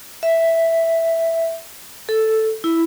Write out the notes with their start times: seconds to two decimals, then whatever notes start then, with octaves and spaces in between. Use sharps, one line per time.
0.23 E5
2.09 A4
2.64 E4